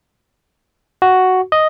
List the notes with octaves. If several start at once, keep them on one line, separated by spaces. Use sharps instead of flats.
F#4
D#5